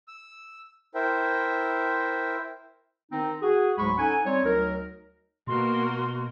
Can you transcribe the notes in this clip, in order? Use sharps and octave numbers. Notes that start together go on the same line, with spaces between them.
E6
E4 A#4 C5 E5 G5
D#3 C4 D#4
F#4 G#4
D2 G#2 F#3 G#3 B5 C#6
C#4 D#4 A4 F#5 G#5
G3 C4 D#4 C#5
D2 F#3 D#4 A#4
B2 A#3 F#4 A#4 C6